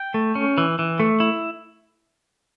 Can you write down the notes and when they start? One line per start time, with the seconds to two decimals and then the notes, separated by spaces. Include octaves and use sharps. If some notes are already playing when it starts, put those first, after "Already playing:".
Already playing: G5
0.14 A3
0.35 C#4
0.58 E3
0.79 E3
1.00 A3
1.20 E4